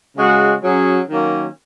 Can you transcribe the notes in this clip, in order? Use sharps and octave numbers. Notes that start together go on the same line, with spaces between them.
C#3 G#3 F#4
F#3 C#4 G#4
D#3 F#3 A#3 C#4